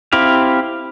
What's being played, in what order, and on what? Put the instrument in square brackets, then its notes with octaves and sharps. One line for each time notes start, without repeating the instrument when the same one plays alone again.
[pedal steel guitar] C4 E4 G4 F5